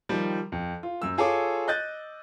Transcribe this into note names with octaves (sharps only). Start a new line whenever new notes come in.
D#3 F3 G3
F2
F4
F#2 E6
F4 G#4 A4 C#5 D6
D#5 F#6 G6 A6